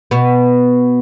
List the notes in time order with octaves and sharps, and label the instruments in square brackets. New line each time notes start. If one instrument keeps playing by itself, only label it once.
[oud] B2 B3